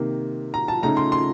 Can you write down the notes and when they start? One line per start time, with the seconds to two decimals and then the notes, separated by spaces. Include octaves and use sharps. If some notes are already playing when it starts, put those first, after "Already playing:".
Already playing: C3 D#3 A#3
0.54 A#5
0.68 A5
0.82 C#3 A3 D#4 A#5
0.97 C6
1.12 C6